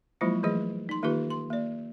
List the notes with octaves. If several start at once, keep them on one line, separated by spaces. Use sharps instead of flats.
F3 F#3 G#3 A#3 E4 F4
E3 F#3 A3 G#4 D#5
D#4 C6
D#3 A#3 D#4 F4 G4 B4
C6
A#3 D5